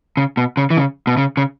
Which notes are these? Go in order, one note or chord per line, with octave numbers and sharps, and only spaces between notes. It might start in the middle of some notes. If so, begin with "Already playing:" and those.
C#3
B2
C#3
E3
C#3
B2
C#3
C#3